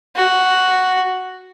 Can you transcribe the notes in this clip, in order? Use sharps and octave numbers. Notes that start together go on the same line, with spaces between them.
F#4